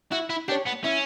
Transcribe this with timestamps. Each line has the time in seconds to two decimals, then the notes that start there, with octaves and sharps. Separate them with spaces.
0.12 E4 F#4
0.30 E4
0.48 D4 G4
0.51 C#5
0.66 B3
0.84 C#4 E4